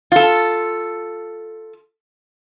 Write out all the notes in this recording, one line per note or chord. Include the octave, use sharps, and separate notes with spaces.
F4 A4